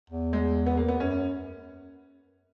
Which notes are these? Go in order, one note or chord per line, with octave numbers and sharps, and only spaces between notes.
E2
G#3
B3
A#3
B3
F#2 C#4